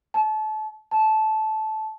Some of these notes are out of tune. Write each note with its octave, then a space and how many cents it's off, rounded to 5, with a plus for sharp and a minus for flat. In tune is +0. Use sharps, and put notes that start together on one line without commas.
A5 -30
A5 -15